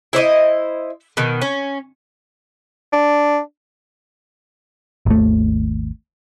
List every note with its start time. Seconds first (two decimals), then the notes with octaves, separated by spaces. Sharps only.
0.13 E4 C5 D5 D#5
1.17 B2 D#3
1.42 C#4
2.93 D4
5.06 G#1 D#2 A3